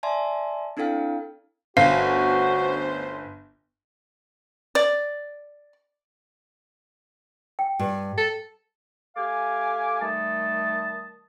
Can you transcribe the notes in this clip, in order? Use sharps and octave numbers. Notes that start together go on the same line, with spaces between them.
D5 E5 G#5 A5 C6
C4 D4 E4 A4 F5 G5
G1 D2 C#4 F#4 C5 F5
D5
G5
G2
A4
A3 G4 F5 G#5 D6
D#3 G3 A3 D#5 A5